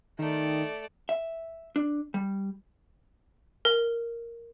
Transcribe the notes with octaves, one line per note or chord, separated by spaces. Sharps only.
D#3 A3 D5
E5
D4
G3
A#4